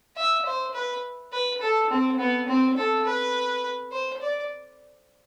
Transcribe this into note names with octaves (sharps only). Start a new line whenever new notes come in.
E5
C5
B4
B4
A4
C4
B3
C4
A4
B4
C5
D5